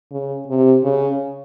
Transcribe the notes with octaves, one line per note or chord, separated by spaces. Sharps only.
C#3
C3
C#3